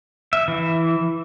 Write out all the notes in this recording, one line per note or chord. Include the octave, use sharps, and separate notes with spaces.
E5
E3